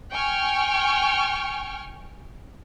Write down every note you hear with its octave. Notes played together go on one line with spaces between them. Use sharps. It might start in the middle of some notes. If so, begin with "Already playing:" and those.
G5 G#5 C#6 F6